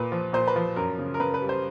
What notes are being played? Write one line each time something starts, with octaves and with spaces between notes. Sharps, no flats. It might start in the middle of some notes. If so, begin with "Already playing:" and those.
Already playing: A#2 B4
F3
A#2 C5
B4
F3
F#2 A#4
C#3
A#4
C#3 B4
B4
G3
C5